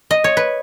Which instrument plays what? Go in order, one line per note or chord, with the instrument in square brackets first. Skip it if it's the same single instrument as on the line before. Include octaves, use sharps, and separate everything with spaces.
[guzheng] D#5
C#5
B4